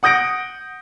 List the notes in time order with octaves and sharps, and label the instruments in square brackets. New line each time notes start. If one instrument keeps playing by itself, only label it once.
[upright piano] F#5 D#6 G6 A#6 D7